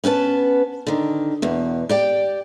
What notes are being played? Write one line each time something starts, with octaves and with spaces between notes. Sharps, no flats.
B3 C#4 B4 A5
D3 D#3
E2 B2
G4 D5 G5